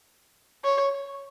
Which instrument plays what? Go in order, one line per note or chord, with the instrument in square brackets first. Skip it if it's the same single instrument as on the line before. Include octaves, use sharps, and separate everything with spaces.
[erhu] C#5